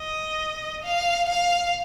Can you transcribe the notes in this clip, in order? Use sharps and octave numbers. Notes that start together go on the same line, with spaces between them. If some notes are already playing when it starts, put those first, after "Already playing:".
Already playing: D#5
F5
F5